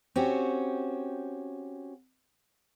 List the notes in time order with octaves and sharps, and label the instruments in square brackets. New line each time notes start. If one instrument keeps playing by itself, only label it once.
[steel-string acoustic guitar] C4 C#4 F#4 G4